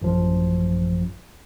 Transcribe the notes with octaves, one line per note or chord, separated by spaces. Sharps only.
A1 F#2 F3